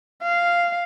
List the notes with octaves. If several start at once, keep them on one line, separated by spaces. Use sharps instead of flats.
F5